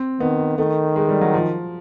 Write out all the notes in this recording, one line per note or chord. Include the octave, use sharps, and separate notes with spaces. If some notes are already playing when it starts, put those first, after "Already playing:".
Already playing: C4
D#3 B3
D#3 A3
G#3
G3
F#3
F3